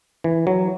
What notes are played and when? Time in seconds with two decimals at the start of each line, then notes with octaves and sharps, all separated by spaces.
0.24 E3
0.47 F#3